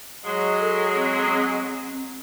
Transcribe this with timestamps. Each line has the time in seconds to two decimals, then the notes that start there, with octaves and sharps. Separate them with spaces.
0.24 F#3 G#3
0.60 A4
0.95 C4
1.34 C4